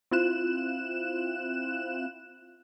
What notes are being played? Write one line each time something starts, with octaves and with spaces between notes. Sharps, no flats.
C4 E4 F4 F#6 E7